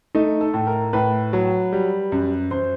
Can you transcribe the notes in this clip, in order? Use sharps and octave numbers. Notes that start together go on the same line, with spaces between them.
A3 D#4
A4
A2
A#4
A2 B4
F#3
G3
F#2
F#2 C5